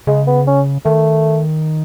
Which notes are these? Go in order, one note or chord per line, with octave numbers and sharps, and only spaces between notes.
C#3 G#3
B3
C#4
D#3 A3